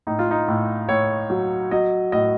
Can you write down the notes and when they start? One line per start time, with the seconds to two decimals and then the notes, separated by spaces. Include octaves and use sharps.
0.07 A2 D#4
0.19 F4
0.31 D#4
0.48 A2
0.89 A2 C#5
1.30 F#3
1.71 F#3 D#5
2.12 A2 D#5